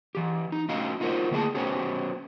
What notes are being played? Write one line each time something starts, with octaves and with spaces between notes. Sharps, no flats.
E3 G4
D#4
A3 C#4 F#4 D#5 F5
D#4 F4 F#4 A#4 C5 D#5
D3 A3 A#3 E4 G#4 A5
B3 C#4 F#4 G4 C5 C#5